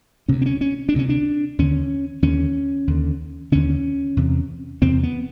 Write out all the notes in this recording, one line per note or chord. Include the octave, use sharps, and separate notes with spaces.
D2 C3 C#4
C4
C#4
C#4
D4
D2 C3 C#4
D4
D#2 D3 C#4
D#2 D3 C#4
D#2 D3
D#2 D3 C#4
E2 C3
E2 C3 C4
B3